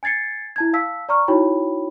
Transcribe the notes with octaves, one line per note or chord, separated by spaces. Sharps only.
G#5 G#6 A6 C7 C#7
E4 A5 G#6
F5 A5 E6 B6
D5 A#5 C#6 F6
D#4 E4 F#4 C#5 G5 B5